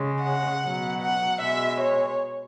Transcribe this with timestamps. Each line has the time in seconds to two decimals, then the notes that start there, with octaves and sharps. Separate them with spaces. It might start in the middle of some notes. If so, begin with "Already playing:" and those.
Already playing: C#3 G#3
0.22 F#5
0.63 B2 F#3
1.01 F#5
1.39 B2 G#3 E5
1.79 C#5